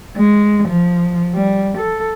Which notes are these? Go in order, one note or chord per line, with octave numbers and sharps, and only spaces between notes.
G#3
F3
G3
A4